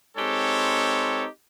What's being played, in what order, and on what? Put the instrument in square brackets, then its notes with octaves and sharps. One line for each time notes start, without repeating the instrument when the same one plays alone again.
[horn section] G#3 C4 D#4 G4 A4 C#5